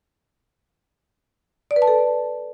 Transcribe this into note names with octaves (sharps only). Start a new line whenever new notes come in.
D5
B4
A5
A4